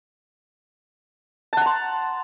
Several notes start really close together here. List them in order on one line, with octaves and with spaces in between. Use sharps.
A5 F#5 A#5 C6